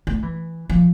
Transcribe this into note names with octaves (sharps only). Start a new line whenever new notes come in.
A3
E3
F3